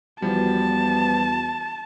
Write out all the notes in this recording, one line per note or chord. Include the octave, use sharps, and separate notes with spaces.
E2 E3 F3 G3 B3 F#4 A5